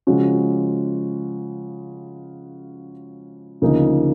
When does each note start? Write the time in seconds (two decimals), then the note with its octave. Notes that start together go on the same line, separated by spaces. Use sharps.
0.07 C#3 F3 G#3 C#4 F#4
3.62 D2 C#3 F3 A#3 D#4